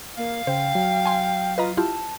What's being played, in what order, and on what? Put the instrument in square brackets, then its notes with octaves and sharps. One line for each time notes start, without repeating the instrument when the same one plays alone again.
[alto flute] A#3 [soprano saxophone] F5
[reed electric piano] C#3 [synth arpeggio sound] C5 [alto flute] G5
[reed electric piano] F#3
[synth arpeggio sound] G#5 C6
[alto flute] F4 [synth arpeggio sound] B4 D#5 A#5
[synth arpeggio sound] E4 F4 G4 [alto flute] A5